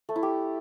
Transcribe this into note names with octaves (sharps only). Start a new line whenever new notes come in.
A3
E4
G4